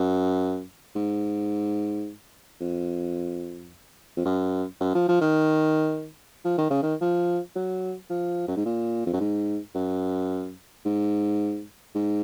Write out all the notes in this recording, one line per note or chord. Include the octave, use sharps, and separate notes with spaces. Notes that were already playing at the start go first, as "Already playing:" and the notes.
Already playing: F#2
G#2
F2
F2
F#2
F#2
F3
F3
D#3
F3
D#3
C#3
D#3
F3
F#3
F3
F#2
G#2
A#2
F2
F#2
G#2
F#2
G#2
G#2